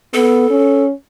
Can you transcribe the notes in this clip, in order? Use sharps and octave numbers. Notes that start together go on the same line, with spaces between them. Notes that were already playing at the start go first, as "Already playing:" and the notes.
B3 A4
C#4